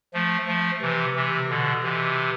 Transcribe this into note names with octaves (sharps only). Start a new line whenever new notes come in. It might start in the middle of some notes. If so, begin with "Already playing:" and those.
F3 A3
F3 A3
C3 E3
C3 E3
B2 D3
C3 E3